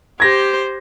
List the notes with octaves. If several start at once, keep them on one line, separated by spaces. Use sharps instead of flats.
G4 C5 G#6 A#6